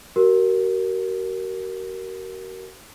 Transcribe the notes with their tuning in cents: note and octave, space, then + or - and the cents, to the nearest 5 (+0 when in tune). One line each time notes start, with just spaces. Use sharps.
F#4 +40 A#4 +0